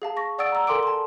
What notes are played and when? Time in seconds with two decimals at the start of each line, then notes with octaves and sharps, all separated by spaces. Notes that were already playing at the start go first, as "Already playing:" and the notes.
0.02 G#4 F5 A5
0.17 C#6 A#6
0.38 D5 F#5 D#6 E6 A6 D7
0.52 A#5 E6
0.67 A4 A#4 G#5 C6 D6 D7
0.83 A5 C6